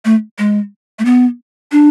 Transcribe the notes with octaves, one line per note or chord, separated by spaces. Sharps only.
A3
G#3
A3
B3
D4